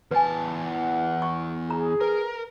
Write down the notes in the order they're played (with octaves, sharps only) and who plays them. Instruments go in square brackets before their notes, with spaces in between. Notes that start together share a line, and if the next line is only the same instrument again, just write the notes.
[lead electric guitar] E2 A5 [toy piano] B4 G#5
[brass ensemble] E3 F#5
[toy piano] C#6
[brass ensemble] G#4 [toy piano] A#5
[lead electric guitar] A#4 [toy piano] B4